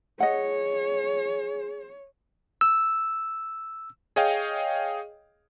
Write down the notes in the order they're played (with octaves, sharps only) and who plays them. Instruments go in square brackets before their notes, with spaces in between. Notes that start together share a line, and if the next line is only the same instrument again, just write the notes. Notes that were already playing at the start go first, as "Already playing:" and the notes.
[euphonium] G#4 [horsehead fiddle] C#5 [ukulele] D#5 F#5
[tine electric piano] E6
[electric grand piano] G#4 C#5 D#5 F5 G5